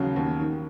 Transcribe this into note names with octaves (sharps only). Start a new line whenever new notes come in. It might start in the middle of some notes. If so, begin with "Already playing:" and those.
Already playing: D#2 C#3 F#3
D#2
D#3